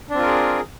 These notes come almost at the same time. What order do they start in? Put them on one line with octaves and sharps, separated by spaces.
D4 C4 F4 A#4 G#4